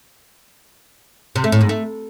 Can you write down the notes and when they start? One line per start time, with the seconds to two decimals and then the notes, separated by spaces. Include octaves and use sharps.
1.36 C3
1.44 A3
1.52 A2
1.61 G#2
1.69 A3